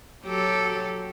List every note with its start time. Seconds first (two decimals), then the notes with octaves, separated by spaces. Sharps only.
0.25 F#3 G4 A4